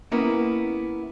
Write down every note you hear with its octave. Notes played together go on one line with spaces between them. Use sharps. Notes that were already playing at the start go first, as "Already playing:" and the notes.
A#3 B3 C#4 E4 A#4